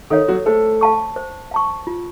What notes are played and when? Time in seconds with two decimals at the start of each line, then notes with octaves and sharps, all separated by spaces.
0.10 D#3 D#4 A4 C#5 F5
0.28 F#3 F#4
0.46 A3 A4 C5
0.81 F5 A5 C#6
1.16 C5
1.51 F5 A5 C#6
1.87 F4